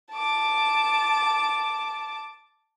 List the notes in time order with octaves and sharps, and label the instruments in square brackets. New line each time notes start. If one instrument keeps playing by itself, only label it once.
[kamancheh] A5 D6